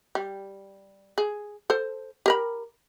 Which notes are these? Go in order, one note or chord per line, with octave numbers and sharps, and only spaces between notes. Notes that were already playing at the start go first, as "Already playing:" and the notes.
G3
G#4
A4 C5
G4 A#4 B5